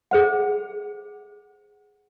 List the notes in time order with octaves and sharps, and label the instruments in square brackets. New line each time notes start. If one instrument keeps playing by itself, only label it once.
[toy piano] G#4 C5 F#5